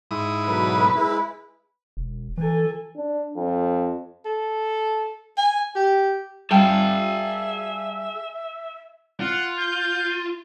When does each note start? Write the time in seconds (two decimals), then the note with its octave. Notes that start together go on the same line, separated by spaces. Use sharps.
0.11 G#2 E4 D#6
0.47 B2 D3 F#3 B4
0.95 G#3 E4
1.97 E1
2.37 E3 A4 G#5
2.96 D4
3.36 F2
4.25 A4
5.38 G#5
5.76 G4
6.51 G3 G#4 E5 F5 G5 A5
9.20 F4 F#5
9.59 G6